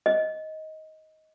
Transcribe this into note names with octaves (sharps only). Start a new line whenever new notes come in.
D#5